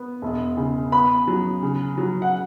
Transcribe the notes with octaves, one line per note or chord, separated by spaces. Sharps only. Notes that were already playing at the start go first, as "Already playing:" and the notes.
Already playing: B3
E1
C#3
B3 B5
F#3
C#3
F#3
F#5